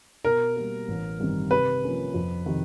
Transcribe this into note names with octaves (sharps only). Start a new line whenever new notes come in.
B2 A#4
G3 A#3
A1
G2 D#3 G3 C4
C3 B4
F3 A#3 C#4
F2
C3 D#3